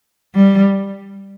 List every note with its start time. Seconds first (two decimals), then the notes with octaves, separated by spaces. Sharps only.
0.35 G3